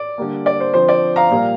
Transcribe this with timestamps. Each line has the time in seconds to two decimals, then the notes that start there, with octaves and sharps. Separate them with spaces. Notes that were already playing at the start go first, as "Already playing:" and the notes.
Already playing: D5
0.18 D3 G3 A#3
0.46 D5
0.60 C5
0.73 D3 F3 C4 C5
0.89 D5
1.16 F5 A#5
1.31 A#2 G3 A#3